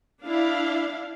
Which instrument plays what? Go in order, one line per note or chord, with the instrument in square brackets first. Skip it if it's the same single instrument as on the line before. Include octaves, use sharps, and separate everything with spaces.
[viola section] D4 E4 F5